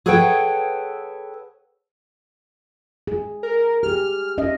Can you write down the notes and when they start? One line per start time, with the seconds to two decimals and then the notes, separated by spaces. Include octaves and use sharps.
0.06 G#4 A4 B4 C#5 F#5 G5
3.07 G#4
3.43 A#4
3.83 G4 G#4 F6
4.38 C#4 D#5 E5